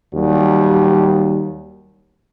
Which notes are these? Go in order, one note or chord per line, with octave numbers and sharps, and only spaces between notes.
D#2 F#3 G3